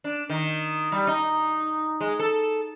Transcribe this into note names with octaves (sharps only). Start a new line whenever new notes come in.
D4
D#3
G3
D#4
G#3
A4